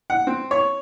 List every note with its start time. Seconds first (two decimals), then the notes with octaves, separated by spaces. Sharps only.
0.10 F#5
0.27 C4
0.51 C#5